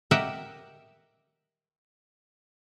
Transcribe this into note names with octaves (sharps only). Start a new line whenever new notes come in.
G4 A#4 D#5 E5 F#5